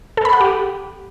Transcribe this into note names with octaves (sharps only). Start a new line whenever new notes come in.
A4
B5
F#5
G4